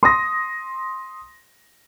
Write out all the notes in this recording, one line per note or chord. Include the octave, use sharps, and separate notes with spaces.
C6 D#6 A#6